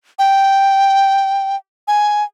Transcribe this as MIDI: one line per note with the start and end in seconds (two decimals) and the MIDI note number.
0.19 1.56 79
1.88 2.24 80